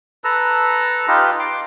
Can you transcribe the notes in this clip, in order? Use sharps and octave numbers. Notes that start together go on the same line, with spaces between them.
A4 B4 A#5 E6
D#4 F4 G4 B4
C6 D6